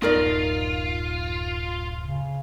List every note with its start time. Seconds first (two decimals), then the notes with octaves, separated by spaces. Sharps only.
0.02 D1 F#2 A3 D#4 F4 A#4 D5
2.01 C#3